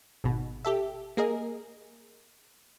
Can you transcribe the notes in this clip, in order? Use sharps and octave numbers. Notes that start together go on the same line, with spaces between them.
G#1 B2
G4 A4 E5
A#3 G#4 A#4 D#5